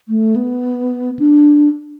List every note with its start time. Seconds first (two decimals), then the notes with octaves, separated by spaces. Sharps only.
0.09 A3
0.36 B3
1.19 D4